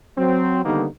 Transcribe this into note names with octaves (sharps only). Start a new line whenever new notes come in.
F#3 C4
D3 D#3 G3 A#3 B3 D#4